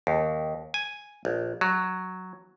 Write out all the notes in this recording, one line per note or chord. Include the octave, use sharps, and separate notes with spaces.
D#2
G#5
A#1
F#3